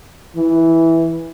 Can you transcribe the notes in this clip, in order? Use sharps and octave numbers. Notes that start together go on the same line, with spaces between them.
E3